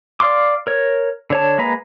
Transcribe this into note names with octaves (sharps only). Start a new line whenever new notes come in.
D5 F5 C6 D6
A#4 C#5
D3 C#5 A5
G#3 A#3 B4 A#5